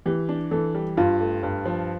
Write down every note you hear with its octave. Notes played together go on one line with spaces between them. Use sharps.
E3 G4
D4
E3 A4
G3
G2 F4
A3
G2
F3